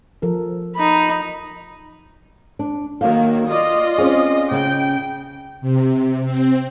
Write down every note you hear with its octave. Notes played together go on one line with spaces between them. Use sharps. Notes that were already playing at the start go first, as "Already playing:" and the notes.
F3 A4 A#4
D#4 B5
D4
D#3 F#3 A#3 F5
F4 D5 D#5
C4 C#4 G#4
C#3 G5
C3
C4